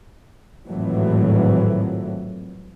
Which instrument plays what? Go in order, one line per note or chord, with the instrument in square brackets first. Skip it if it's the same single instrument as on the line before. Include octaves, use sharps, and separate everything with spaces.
[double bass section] G#1 F2 A2 E3 F#3